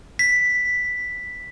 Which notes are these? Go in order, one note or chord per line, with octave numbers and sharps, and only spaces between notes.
B6